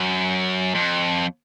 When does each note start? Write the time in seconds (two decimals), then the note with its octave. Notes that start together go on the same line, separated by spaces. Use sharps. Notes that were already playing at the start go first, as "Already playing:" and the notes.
Already playing: F#2
0.75 F2